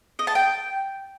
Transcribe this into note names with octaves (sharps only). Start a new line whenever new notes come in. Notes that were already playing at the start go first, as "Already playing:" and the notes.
D#5
A5
G5